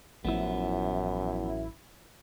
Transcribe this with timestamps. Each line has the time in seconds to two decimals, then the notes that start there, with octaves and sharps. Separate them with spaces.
0.25 A1 F#2 F3 B3 E4